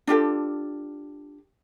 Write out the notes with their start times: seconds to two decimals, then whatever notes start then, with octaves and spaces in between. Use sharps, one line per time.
0.07 D4 F4 G4 A4